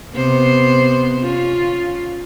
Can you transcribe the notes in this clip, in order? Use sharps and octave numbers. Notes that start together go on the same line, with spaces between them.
C3 B3 C5
C#4 F4